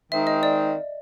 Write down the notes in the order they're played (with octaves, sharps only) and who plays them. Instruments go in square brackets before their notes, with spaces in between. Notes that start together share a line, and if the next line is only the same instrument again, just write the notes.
[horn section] D#3 G#3 C4 D#4 [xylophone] E5
[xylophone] D#5
D5